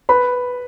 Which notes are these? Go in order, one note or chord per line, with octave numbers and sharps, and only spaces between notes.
B4 B5